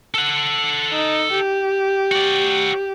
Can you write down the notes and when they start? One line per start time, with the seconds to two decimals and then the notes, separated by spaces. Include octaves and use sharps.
0.14 A4 F#5
0.92 D#4
1.31 G4
2.11 F#4 D5